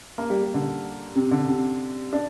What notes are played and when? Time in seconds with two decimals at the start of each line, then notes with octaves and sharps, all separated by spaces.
0.18 A#3
0.30 G3
0.42 G3
0.54 D3
1.15 C3
1.31 D3
1.48 C3
2.13 D4